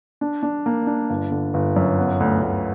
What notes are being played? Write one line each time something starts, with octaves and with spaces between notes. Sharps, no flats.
D4
D4
A#3
D4
G1
D3
G1
F#2
B3
D2
D2